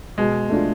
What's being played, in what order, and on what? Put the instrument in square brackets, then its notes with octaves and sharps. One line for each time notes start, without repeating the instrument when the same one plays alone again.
[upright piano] B2 [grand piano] G#3
[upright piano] A3 D4 F4